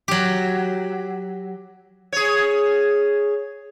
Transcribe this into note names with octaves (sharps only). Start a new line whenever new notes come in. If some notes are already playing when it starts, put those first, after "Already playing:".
F#3 G4
G#4 C#5